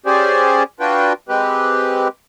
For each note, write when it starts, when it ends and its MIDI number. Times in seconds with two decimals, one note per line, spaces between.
0.06 0.63 61
0.06 0.63 67
0.06 0.63 68
0.06 0.63 72
0.06 0.63 74
0.06 0.63 80
0.80 1.13 62
0.80 1.13 65
0.80 1.13 66
0.80 1.13 71
0.80 1.13 79
1.29 2.08 56
1.29 2.08 60
1.29 2.08 67
1.29 2.08 71